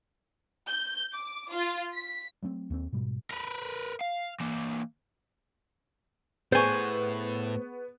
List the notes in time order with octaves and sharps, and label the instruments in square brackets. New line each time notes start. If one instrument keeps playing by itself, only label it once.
[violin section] G6
D6
F4
B6
[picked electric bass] F#3 A3 B3 C4
D#2 A3 C4
G#2 B2 G3
[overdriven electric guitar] A#4 B4
F5
E3 A#3
[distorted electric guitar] A2 [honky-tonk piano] B3 [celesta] G#4 C#6 [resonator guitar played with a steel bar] C5 G#5